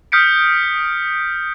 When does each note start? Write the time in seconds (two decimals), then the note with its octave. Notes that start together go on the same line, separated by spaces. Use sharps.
0.12 D#6 F6 G6 B6 C#7 D7